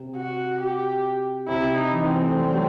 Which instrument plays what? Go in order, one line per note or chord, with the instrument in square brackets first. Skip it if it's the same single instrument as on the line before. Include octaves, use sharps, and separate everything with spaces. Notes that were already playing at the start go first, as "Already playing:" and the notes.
Already playing: [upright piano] C3
[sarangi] F#4
G4
[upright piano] C3 [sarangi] E4
[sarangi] D#4
[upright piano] E3
[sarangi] C4
[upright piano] A3
G3
F#3